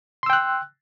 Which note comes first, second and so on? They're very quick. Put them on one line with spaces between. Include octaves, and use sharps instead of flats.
C6 E6 G5 F#6